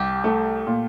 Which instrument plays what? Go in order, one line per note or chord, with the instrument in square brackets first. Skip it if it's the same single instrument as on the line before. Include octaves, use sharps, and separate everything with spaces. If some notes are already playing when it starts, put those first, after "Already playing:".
Already playing: [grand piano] C2 [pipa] G4
[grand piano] A3
A#2